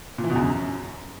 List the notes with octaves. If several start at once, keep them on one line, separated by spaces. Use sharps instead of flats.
A#2
E3
B2
E2
F#2